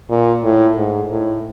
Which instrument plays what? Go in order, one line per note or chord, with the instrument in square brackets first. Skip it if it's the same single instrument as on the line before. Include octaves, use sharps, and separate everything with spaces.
[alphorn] A#2
A2
G#2
A2